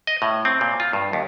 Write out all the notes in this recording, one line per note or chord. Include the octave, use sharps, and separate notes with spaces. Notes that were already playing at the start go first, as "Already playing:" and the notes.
D#5
A2
C4
A#2
F4
G2
D#2